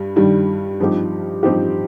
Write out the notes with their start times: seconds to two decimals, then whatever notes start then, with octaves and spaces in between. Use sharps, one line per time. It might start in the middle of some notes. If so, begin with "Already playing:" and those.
Already playing: G2 G3
0.16 G2 D#3 G3
0.80 G2 F3 C4 D#4 G4
1.43 G2 F3 C4 D#4 G4